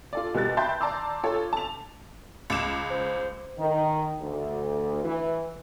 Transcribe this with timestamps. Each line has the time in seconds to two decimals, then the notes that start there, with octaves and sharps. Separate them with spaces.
0.13 F4 A4 D5
0.34 B2 G3 A#4 F#6 A6
0.57 E5 G5 A5 B5 C6 G6
0.81 D5 A5 A#5 C6 D6 E6
1.23 F4 A4 C#5
1.53 A5 F7
2.50 C#2 D6 E7
2.91 C5
3.58 D#3
4.20 D2
5.04 E3